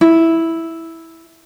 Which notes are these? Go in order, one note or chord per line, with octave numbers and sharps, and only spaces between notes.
E4